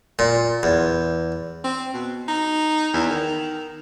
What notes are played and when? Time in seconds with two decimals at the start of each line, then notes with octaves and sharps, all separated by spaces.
0.19 A#2
0.63 E2
1.64 C4
1.93 B2
2.27 D#4
2.93 E2
3.10 D#3